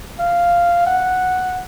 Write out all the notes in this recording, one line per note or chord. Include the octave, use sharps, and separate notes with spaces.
F5
F#5